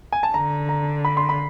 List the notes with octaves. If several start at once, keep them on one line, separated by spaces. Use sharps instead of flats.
G#5
A5
D3 A#5
A#5
B5
C6
B5